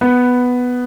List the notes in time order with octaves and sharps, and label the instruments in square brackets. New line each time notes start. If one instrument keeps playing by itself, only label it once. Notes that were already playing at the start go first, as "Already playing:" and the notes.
[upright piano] B3